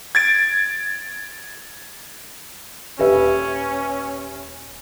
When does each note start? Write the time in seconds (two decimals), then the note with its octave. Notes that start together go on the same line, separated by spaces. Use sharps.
0.15 G#6 A6 D7
2.99 D#1 G#1 C#4 G4 B4 E5